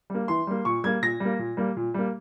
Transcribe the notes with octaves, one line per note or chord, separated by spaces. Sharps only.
G3 A#3
E3 C6
G3 A#3
A#2 C#6
G3 A#3 G#6
A#2 A#6
G3 A#3
A#2
G3 A#3
A#2
G3 A#3